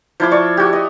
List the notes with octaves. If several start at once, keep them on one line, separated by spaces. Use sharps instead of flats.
F3 E4 D6
D5 C#6
F#4 G4
D#5